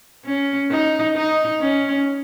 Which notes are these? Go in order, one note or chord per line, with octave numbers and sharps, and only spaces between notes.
C#4
D#4
D#4
C#4